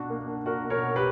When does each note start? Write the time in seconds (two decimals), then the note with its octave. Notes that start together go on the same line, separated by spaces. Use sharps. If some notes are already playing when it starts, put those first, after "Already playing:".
Already playing: B2 D4 F#4
0.10 A#3
0.27 D4
0.46 D4 F#4 A#4
0.65 B2
0.70 A#4 C#5
0.83 B2
0.96 G4 B4